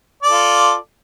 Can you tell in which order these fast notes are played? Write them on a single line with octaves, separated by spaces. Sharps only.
D5 A4 F4